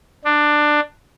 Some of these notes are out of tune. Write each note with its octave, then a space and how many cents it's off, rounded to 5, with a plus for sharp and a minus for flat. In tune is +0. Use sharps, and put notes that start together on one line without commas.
D4 +15